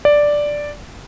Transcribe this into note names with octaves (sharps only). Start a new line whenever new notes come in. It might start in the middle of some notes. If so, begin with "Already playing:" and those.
D5